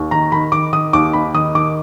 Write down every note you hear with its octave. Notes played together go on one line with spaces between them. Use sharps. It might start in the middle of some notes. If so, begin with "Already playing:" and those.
Already playing: D#2
D#3 A#5
D#3 B5
D#3 D6
D#3 D#6
D#2 D6
D#2 B5
D#3 D#6
D#3 D6